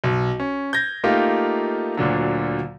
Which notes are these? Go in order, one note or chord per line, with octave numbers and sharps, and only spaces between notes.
B1
C#4
G6 G#6 A#6
A3 A#3 D#4 F4 G4
D2 A#2 D3 F#3